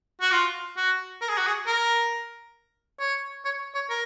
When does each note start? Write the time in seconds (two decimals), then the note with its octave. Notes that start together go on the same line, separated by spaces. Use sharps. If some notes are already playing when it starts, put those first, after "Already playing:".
0.21 F#4
0.32 F4
0.77 F#4
1.21 A#4
1.29 G#4
1.38 F#4
1.47 G#4
1.67 A#4
3.00 C#5
3.45 C#5
3.75 C#5
3.90 A#4